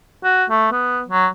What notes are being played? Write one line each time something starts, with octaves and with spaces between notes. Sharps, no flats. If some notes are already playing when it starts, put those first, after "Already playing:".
F#4
A3
B3
F#3